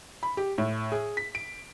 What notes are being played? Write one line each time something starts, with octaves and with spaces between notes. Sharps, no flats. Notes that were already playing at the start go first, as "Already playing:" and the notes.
B5
G4
A2
G#4
B6
D7